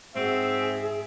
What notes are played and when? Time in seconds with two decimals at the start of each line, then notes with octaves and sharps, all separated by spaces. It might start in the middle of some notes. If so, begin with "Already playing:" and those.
0.16 G#2 C4 F#4 G#4 E5